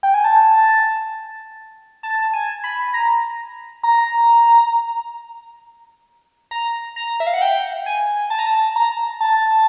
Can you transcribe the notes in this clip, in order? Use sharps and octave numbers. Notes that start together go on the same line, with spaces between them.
G5
G#5
A5
A5
A5
G#5
B5
A#5
A#5
A#5
A#5
E5
F5
F#5
G5
G#5
A5
A#5
A5
A#5
A5